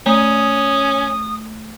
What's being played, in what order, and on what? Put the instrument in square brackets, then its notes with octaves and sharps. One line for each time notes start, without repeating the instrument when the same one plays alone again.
[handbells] A3 [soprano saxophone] C#4 [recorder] D#6